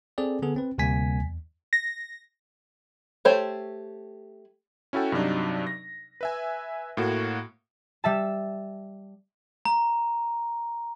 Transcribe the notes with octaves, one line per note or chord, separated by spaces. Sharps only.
C4 G#4 A4 D5
D3 B3 G#4 A4
C4 B4
D2 C3 G3 A#3 G#5 B6
E2
A#6
A3 G4 C5 C#5
C#4 E4 F#4 A4 G5
G2 C3 F#3 D4 D#4
A#6
B4 E5 G#5
A2 A#3 F#4
G3 E5 A5
A#5